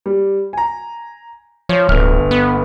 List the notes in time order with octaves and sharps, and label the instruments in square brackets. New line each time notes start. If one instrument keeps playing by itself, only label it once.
[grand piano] G3
G#5 A#5
[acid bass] F3 [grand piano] C#5
[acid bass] D1 [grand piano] G1 F6
[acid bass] B3